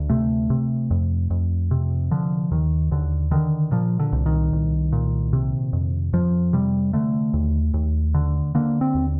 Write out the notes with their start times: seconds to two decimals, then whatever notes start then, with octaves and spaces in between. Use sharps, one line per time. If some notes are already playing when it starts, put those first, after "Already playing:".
Already playing: D2
0.10 C3 A3
0.50 C3
0.91 F2
1.30 F2
1.71 C3
2.11 D3 F3
2.51 D#2 D#3
2.91 D#2 D3
3.31 D3 D#3
3.72 A#2 F3
4.00 D3
4.12 C2
4.26 D#3
4.53 C2
4.92 A#2
5.33 C3
5.73 F2
6.13 F2 F3
6.53 C3 G3
6.93 D3 A3
7.34 D#2
7.74 D#2
8.14 D3
8.55 D3 A#3
8.81 C4
8.95 D#2